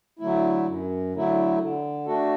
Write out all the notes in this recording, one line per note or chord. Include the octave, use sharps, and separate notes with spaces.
D3 F#3 A3 E4
F#2
D3 F#3 A3 E4
D3
A3 D4 F#4 A4